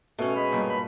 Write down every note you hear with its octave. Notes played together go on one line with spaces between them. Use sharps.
B2 A3 C#4
G#3 B5
G2 A#2 G3
B5